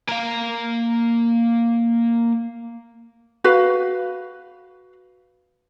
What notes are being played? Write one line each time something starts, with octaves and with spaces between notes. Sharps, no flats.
A#3 F5
F#4 B4 F5